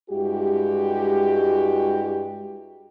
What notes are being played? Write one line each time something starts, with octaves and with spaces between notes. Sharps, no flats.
G2 G#3 E4 F#4 G4